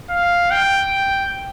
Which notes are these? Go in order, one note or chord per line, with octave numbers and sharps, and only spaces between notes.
F5
G5